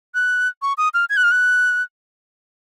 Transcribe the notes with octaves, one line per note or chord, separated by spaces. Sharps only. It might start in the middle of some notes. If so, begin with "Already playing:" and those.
F#6
C#6
D#6
F6
G#6
F#6
F6
F#6